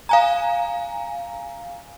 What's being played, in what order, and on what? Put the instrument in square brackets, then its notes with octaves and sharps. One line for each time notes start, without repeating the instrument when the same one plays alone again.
[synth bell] F5 G#5 A#5